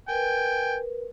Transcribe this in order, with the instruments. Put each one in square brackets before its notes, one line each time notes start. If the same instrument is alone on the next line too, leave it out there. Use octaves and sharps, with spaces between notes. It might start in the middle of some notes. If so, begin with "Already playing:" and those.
[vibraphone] A#4 B4 [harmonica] G5 G#5